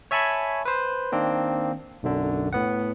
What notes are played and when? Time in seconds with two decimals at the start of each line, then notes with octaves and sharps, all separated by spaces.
0.11 C#5 E5 G#5 A5 B5 C#6
0.65 B4 C5
1.12 D#3 A#3 C4 D4
2.03 B1 F#2 D3
2.53 A2 B3 F#5